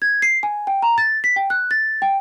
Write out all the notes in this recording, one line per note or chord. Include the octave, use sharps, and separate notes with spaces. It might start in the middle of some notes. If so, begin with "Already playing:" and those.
G#6
C7
G#5
G5
A#5
A6
B6
G5
F#6
A6
G5